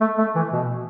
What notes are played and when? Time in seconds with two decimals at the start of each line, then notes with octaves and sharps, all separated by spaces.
0.01 A3
0.18 A3
0.35 E3
0.53 B2